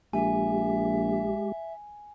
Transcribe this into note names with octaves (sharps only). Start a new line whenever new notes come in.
A#1 G#3 G4 E5 G#5